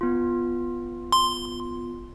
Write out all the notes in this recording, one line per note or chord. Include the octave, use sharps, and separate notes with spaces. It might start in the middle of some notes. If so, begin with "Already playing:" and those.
B3 F4
C6